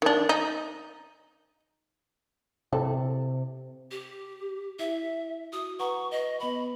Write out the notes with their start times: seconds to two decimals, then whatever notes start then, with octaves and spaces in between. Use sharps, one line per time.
0.02 D#3 D4
0.29 D#4
2.73 C3 E3 A4
3.91 G4
4.79 E4 E5
5.53 F#4 D#6
5.79 B4 F#5 A#5 C#6
6.11 B4 D#5
6.40 B3 B4 B5